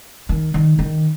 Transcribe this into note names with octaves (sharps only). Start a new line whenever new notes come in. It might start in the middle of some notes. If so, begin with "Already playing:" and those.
D#3
D#3
D#3